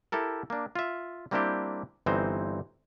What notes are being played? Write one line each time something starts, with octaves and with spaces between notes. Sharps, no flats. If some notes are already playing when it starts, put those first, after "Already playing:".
E4 G4 A4 A#4
A#3 D4
F4 E5
G3 A#3 C4 D4 E4 G4
G1 E3 C4 D#4 C5